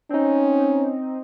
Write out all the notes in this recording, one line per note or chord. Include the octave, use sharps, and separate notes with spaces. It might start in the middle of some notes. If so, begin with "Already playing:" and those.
C4 C#4 D#4